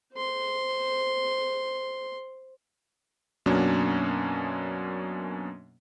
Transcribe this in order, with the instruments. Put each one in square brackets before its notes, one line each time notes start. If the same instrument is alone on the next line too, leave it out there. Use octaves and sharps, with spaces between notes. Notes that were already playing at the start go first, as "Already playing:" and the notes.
[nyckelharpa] C5 C6
[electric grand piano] F#2 B2 F#3 A#3 C#4 D4